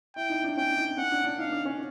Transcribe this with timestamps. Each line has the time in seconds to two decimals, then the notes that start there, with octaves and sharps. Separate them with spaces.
0.16 E4 G5
0.29 D#4
0.44 D4
0.57 C#4 G5
0.77 D#4
0.98 C#4 F#5
1.11 D4
1.24 D4
1.38 D#4 F5
1.52 D4
1.65 C#4